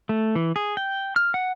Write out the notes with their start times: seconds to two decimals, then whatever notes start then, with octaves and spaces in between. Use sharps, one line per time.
0.09 A3
0.35 E3
0.56 G#4
0.77 G5
1.16 F6
1.34 F#5